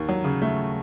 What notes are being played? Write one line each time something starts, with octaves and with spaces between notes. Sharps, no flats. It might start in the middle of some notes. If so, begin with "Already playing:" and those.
Already playing: D#2
F#3
C#3
A3